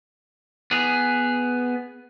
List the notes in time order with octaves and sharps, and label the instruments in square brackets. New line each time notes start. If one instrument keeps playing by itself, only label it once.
[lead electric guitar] B3 G#4